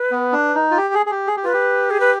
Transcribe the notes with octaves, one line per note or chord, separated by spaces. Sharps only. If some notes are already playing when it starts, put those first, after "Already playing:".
Already playing: B4
B3
D4
D#4
F4
G4
G#4
G#4
G4
G#4
G4
F4 B4
G4
G#4
B4